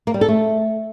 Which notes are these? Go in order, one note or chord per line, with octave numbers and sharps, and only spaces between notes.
A#3
G3
A4
A3